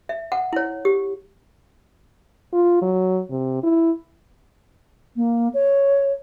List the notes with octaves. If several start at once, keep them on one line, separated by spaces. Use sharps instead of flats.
E5
F#5
E4 C#5
G4
F4
F#3
C3
E4
A#3
C#5